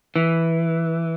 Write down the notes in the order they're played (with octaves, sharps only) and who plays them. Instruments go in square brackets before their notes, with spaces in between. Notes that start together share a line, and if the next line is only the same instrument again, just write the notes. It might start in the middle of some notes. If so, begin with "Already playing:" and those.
[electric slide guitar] E3